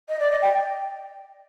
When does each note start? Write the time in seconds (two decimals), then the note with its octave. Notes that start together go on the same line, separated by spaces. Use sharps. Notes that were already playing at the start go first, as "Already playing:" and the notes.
0.08 D#5
0.19 D5
0.31 D#5
0.42 G5